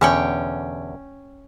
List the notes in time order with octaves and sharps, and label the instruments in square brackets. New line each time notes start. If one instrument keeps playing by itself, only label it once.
[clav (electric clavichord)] E2 B2 D3 [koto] C#4 C#5 G5